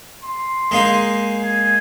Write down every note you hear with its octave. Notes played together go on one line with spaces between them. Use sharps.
C6
G#3 A#3 D#4
G#5